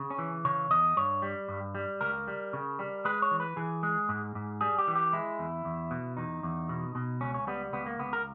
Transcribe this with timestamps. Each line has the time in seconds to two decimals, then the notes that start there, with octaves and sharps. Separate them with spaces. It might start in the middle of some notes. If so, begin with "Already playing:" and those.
Already playing: C#3
0.10 C#4
0.19 E3
0.45 C#3 C#5
0.71 E2 D#5
0.97 G2 C#5
1.22 G3
1.49 G2
1.75 G3
2.01 C#2 A#4
2.27 G3
2.53 C#3
2.79 G3
3.05 G#3 B4
3.22 C#5
3.31 E3
3.40 B4
3.57 E3 G#4
3.83 G#3
4.09 G#2
4.35 G#2
4.61 G3 G#4
4.78 G4
4.88 E3
4.95 G4
5.13 G#3 E4
5.39 E2
5.65 E2
5.91 B2
6.17 E2 D#4
6.43 E2
6.69 B2
6.95 B2
7.21 C#2 C#4
7.34 C#4
7.47 G3 B3
7.73 C#2 B3
7.86 A#3
7.99 C#2 B3
8.13 A#4